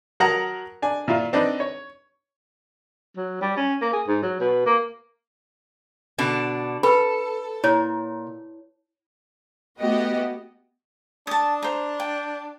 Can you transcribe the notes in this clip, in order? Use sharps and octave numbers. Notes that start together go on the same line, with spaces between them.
F#3 A#4 F#5 A5 A#5 D#6
D4 G#5
A#2 E4 F4
C4 D4 D#4 B4
C#5
F#3
G3
C#4
A#3
G#4
G#2
F#3
B2
A#3
B2 D3 D4
A4 B4 B5
A#2 E4 C#5
A3 B3 F#4 G4 D#5
D4 A5 D#6
C5 A#5
G5